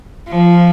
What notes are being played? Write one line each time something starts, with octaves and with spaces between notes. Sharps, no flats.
F3